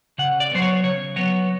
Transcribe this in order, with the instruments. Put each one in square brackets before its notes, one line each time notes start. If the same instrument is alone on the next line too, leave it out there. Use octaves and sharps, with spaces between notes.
[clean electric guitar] C#3 F#5
D5
F#3 B3 C5
C#5
C#3 C#5
F#3 B3 C#5